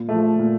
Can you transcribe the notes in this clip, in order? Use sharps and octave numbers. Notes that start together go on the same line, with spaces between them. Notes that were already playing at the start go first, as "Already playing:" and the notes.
Already playing: A#2
F3 A3
A#2